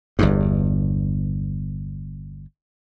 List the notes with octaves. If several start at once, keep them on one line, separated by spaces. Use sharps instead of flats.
G1 E2 G2